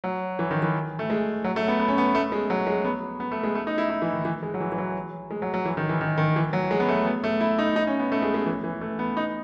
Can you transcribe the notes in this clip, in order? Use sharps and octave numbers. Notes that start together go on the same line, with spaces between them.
F#3
E3
D#3
E3
A3
G#3
F#3
A3
B3
B3
C#4
B3
A3
G#3
F#3
G#3
B3
B3
A3
G#3
A3
D#4
E4
D#4
E3
D#3
E3
G#3
F#3
E3
E3
F#3
G#3
F#3
F#3
E3
D#3
E3
D#3
D#3
E3
F#3
G#3
B3
A3
B3
A3
E4
D#4
D#4
C#4
B3
A3
G#3
G#3
E3
E3
A3
B3
D#4